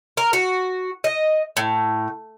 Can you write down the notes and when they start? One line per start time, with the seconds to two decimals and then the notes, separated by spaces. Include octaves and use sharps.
0.17 A#4
0.33 F#4
1.04 D#5
1.57 A2